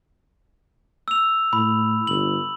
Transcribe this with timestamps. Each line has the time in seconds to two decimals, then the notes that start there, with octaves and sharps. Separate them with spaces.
1.08 E6 F7
1.53 A2 B5
2.07 G1 F#7